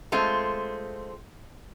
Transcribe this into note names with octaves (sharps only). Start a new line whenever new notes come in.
G#3 A3 C4 F4